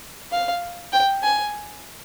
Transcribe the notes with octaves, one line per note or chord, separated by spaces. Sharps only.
F5
G5
G#5